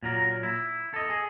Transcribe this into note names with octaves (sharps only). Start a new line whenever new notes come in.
A#2 F#3 A#4
E4
A4 D#5
G#4